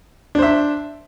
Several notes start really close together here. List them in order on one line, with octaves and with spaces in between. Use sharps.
D4 C5 E5